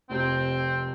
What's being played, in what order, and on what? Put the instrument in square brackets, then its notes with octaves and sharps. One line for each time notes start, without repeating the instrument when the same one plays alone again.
[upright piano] F1 F2 C3 [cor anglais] C4